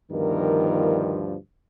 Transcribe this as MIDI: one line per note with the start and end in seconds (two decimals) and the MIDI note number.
0.12 1.36 38
0.12 1.36 43
0.12 1.24 51
0.12 1.36 53
0.12 1.08 59
0.12 1.08 70